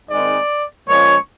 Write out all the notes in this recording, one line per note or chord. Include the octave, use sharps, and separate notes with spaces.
G#2 D#3 G#3 C4 D#4 D5
A#2 F3 G#3 C#4 C#5